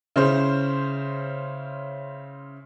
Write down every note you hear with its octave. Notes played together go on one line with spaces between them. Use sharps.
C#3 C#4 E4 C5